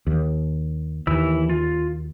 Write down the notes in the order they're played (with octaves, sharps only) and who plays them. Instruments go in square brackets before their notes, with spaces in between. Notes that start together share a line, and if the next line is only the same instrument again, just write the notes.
[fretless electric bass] D#2
[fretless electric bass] D#2 [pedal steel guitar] E3 E4 E6
[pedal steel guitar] F4